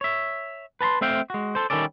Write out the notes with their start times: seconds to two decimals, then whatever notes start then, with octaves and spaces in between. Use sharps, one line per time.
0.01 C#5 E5
0.81 B4 A5 A#5 C6
1.01 A3 C4 E5 F5 G5
1.30 G#3 F#4
1.55 A4 C5
1.70 D#3 G3 C#4 A4 D5